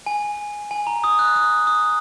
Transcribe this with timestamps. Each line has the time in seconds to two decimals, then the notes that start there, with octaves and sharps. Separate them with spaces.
0.06 G#5
0.71 G#5
0.87 A#5
1.04 D#6
1.19 F#6
1.36 D#6
1.67 D#6